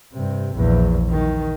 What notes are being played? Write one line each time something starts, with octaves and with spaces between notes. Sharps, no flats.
G2 C3
A#1 E2
D#3